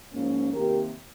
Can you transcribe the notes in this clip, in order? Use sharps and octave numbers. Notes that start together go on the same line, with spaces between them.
G#2 F3 A#3 C#4
C3 D#3 A#3 G4 A#4